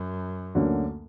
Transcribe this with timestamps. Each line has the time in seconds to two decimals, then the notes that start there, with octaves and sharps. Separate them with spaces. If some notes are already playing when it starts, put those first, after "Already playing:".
Already playing: F#2
0.55 D2 D3 F#3 A#3 C#4